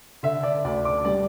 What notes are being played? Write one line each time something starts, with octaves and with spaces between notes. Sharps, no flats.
D3 E5
D5
D2 D5
D6
G3 D5